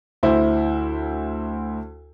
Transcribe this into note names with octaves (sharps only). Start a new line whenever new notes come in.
D2 E4 C5